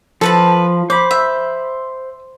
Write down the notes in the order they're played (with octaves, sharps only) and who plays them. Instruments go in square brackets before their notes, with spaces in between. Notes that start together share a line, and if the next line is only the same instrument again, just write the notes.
[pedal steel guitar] F3 [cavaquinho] A4 B4 B5
[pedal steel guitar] C5 B5 [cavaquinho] D6
[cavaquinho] E5